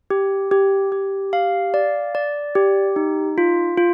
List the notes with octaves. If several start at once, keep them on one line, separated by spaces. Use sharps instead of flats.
G4
G4
G4
F5
D5
D5
G4
D#4
F4
F4